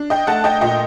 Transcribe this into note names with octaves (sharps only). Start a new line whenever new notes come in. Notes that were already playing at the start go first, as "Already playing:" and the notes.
Already playing: D4
D#5 G5
A3 F#5 A5
D#5 G5
A#2 D#5 G5